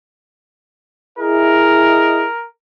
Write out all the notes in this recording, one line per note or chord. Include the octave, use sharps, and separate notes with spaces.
E4 G#4 A#4 D#5